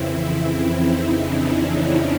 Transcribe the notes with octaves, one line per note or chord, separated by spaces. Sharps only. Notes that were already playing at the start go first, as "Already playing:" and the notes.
Already playing: F2 C#3 E3 C4 E4
D#4
D4
C#4
B3